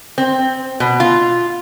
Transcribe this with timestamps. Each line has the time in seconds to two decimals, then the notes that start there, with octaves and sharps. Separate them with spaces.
0.18 C4
0.80 B2
1.00 F4